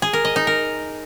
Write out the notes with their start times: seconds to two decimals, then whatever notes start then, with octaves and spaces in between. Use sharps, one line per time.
0.02 G#4
0.13 A#4
0.25 D#5
0.36 D#4
0.47 A#4